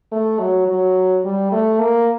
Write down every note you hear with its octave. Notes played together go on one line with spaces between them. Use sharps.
A3
F#3
F#3
G3
A3
A#3